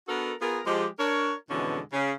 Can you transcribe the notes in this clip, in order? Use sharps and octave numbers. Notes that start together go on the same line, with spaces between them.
B3 D4 F#4 A4 A#4
B3 F4 G#4 A#4
F3 G#3 G4
D4 A#4 C#5
F2 B2 D3 E3 G#3 C#4
C#3